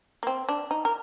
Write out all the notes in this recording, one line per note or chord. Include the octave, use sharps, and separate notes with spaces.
A#3
C4
D4
D#4
A#4